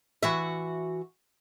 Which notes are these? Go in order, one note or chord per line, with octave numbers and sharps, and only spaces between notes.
E3 F#4 E5